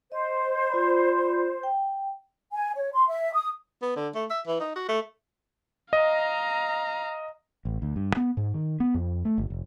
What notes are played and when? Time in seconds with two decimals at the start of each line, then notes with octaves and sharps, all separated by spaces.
0.12 C5 D#5
0.70 F4 D5 B5
1.63 G5
2.52 G#5
2.75 C#5
2.92 C6
3.08 E5
3.33 D#6
3.82 B3
3.96 D3
4.15 A3
4.30 E5
4.47 E3
4.60 D#4
4.76 F#4
4.89 A3
5.93 D#5 F5 A#5
7.65 A1
7.82 D2
7.96 G2
8.17 B3
8.37 G#2
8.54 D#3
8.80 B3
8.94 F2
9.25 A3
9.38 G1
9.50 F1